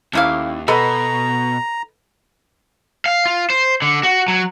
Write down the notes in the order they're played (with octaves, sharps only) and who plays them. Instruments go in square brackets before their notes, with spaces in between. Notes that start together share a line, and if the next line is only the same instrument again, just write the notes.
[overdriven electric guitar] D#2 [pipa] A3 A#3 F5 [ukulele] C#4 E4
[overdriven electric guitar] B2 [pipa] B3 [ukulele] A4 D#5 B5 [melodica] A#5
[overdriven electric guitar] F5
F4
C5
D3
F#4
F#3